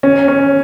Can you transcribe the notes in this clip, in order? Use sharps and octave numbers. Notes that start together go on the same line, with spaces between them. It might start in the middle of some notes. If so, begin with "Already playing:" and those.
C#4
C#4